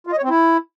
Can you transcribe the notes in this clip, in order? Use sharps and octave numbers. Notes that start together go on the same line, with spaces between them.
F4
D#5
C#5
C4
E4